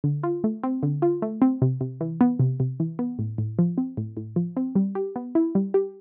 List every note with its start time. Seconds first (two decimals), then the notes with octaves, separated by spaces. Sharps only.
0.04 D3
0.23 F4
0.44 A3
0.63 C4
0.83 D3
1.02 F4
1.22 A3
1.42 C4
1.62 C3
1.81 C3
2.01 E3
2.21 B3
2.39 C3
2.60 C3
2.80 E3
2.99 B3
3.19 A2
3.38 A2
3.59 F3
3.78 C4
3.97 A2
4.17 A2
4.36 F3
4.57 C4
4.75 G3
4.95 G4
5.16 B3
5.35 E4
5.55 G3
5.74 G4